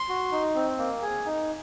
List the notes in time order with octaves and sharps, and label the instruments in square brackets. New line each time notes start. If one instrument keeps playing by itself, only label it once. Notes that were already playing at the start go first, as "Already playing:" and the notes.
Already playing: [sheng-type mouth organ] C6
F#4
D#4
C4
A#3
G#4
D#4